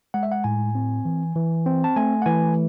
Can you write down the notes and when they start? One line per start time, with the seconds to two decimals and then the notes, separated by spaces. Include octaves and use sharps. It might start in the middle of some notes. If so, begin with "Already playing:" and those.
0.14 G#3 F#5
0.23 E5
0.32 F#5
0.44 A2 G#5
0.75 C4
1.05 E3
1.36 E3
1.66 C4
1.84 A5
1.96 A3 G#5
2.22 F#5
2.26 E3 G#5